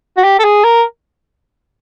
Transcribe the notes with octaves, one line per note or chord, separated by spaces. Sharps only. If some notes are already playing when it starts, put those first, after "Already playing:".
F#4
G4
A4
G#4
A#4